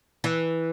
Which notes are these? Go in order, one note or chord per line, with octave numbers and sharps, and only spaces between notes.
E3